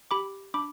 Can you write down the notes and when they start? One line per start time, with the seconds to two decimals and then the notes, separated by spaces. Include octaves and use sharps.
0.11 G4 B5 D6
0.54 D4 B5 D6